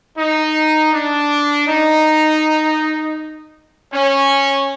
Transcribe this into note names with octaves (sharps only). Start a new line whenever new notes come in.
D#4
D4
D#4
C#4